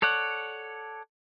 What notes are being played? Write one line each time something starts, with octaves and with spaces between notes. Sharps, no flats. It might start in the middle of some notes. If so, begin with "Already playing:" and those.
A4 C#5 D5 F#5